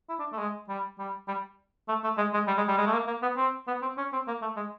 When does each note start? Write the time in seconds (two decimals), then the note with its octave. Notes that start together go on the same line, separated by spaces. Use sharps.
0.09 E4
0.19 D4
0.32 A3
0.38 G#3
0.69 G3
0.99 G3
1.28 G3
1.88 A3
2.04 A3
2.17 G#3
2.34 G#3
2.47 G3
2.57 G#3
2.68 G3
2.78 G#3
2.87 A3
2.93 A#3
3.07 A#3
3.22 B3
3.37 C4
3.68 B3
3.82 C4
3.98 C#4
4.13 C4
4.27 A#3
4.42 A3
4.56 G#3